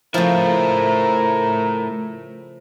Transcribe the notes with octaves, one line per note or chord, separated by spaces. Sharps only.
C#3 F3 A3 E4 A#4